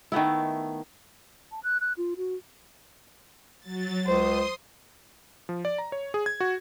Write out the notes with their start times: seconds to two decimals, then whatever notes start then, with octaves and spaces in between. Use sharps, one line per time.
0.12 D#3 A3 B3 E4
1.51 A5
1.64 F#6
1.81 F#6
1.97 F4
2.17 F#4
3.59 F#3 A6
4.06 C#2 C5 C6 D#6
5.49 F3
5.65 D5
5.78 A#5
5.92 C#5
6.14 G#4
6.26 G#6
6.40 F#4